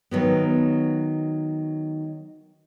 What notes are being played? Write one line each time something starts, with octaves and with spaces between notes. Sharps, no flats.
D#3 F#3 B3